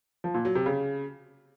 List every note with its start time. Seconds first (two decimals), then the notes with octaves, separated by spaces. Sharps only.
0.24 F3
0.34 A#2
0.45 F#3
0.55 C3
0.66 C#3